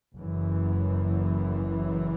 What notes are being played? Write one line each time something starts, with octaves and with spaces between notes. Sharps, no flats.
F#1 F#2 E3